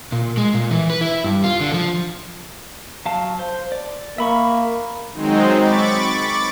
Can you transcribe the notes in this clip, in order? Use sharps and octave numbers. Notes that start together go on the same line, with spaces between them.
A#2
G#3
A#2
E3
B4
E4
G2
F4
D3
F3
F#3 F5 A5
C5
D5
A#3 E5 B5 C#6
D#3 F#3 G#3 C4 D#4
B5 C#6 D6 A6